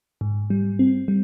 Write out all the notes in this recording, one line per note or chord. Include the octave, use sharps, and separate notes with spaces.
G#2
G3
C4
G3